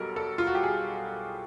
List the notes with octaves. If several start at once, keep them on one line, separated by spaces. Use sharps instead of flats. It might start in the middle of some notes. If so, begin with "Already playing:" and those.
Already playing: B1 B2 G3 A4 A#4
A4
F4
F#4
G4
G#4